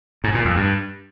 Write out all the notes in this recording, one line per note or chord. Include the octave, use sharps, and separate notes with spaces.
G#2
A#2
F2
G2